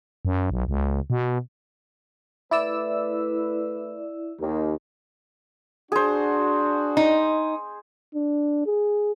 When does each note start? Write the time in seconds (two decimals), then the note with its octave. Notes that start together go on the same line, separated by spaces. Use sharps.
0.25 F#2
0.50 B1
0.68 C#2
1.10 B2
2.51 A3 E4 B4 D5 E6
4.39 D#2
5.92 D4 F#4 G#4 C5
6.97 D#4
8.15 D4
8.66 G#4